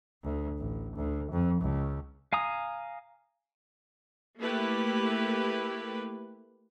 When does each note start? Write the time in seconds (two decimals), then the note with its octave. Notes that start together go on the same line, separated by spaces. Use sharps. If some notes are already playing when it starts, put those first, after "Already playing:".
0.23 D2
0.58 A1
0.96 D2
1.31 F2
1.61 C#2
2.33 F5 G#5 A#5 D#6
4.41 A3 A#3 E4 G4 B4